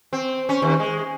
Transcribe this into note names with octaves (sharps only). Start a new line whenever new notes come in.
C4
C#4
D#2
G#3